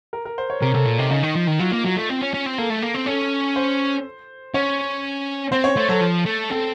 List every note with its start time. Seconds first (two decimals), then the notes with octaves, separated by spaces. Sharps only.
0.13 A#4
0.25 A#4
0.38 C5
0.50 C#5
0.62 C3 A#4
0.74 C3 A4
0.86 A#2
0.99 C3 D#4
1.11 C#3 D#4
1.23 D#3
1.36 F3
1.48 D#3
1.60 F#3 F4
1.72 A#3
1.85 F#3
1.97 A3
2.10 C4
2.21 C#4
2.34 C#4
2.46 C4
2.58 A#3 A4
2.70 A3
2.82 A#3
2.95 C4
3.07 C#4 A4
3.56 C5
4.54 C#4 C#5
5.52 C4 C5
5.64 C#5
5.77 A3 C5
5.89 F#3 A4
6.01 F3
6.26 A3
6.50 C4 A4